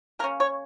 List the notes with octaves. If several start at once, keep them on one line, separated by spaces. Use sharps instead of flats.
C#3 A#3 C#4 A#4
C#5